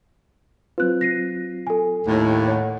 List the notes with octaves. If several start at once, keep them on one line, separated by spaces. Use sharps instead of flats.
F#3 C4 F4 B4 F#6
A#6 C7 D#7
A4 G#5
D#2 A2
C#5 F#5